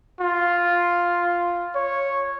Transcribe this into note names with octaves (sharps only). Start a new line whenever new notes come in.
F4
C#5